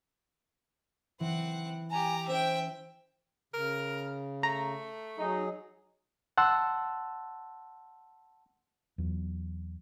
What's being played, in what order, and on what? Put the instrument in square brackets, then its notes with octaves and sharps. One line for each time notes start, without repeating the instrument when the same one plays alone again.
[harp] E3 [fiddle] C4 F#5
[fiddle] G4 A#5 [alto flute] G#5
[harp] C#4 [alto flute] C5 [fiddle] E5 G5
[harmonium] C#3 [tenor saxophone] A#4
[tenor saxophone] A3 [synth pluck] A#5
[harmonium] F#3 G#4 [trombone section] D#4
[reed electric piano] F#5 A5 C6 E6
[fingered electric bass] E2 F#3